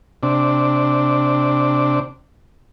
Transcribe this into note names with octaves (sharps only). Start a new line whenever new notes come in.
C3 D4